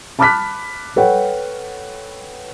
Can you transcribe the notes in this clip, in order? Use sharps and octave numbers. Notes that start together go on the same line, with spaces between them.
A5 B5 D6 F6 F#6 B6
A4 B4 C#5 F#5 G5